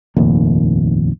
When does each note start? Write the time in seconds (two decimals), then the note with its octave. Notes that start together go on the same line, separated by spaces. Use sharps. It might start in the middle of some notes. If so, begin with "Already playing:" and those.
0.16 F1 A#1 D#2